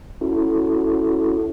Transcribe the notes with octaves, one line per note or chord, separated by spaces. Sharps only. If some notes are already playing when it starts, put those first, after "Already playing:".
C#4 E4 F#4 A4